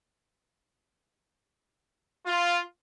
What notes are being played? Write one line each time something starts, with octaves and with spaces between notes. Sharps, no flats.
F4